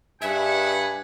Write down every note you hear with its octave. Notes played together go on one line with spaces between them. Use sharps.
G2 G#4 B4 E5 F#5 G#5